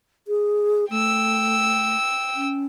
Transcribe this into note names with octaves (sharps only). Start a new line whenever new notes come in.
G#4
A3 G5 E6
C#4